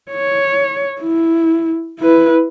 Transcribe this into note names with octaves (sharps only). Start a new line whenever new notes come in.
C#5
E4
E4 B4